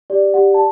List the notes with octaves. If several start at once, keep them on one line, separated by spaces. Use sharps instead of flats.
G4 D5
G4 F#5
A5